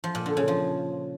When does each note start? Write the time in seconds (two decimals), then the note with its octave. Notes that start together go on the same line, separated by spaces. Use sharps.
0.04 F3
0.15 A#2
0.26 D3
0.37 C#3
0.48 F3